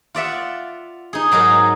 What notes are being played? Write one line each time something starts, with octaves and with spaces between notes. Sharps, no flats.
F4 D5 E5 F#5
D#4 G#4
G#2 F#3 D#4 A#4